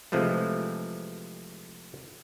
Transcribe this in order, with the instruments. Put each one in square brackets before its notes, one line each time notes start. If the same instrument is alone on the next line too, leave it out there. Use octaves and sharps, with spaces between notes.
[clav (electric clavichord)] C3 E3 F3 G#3 A3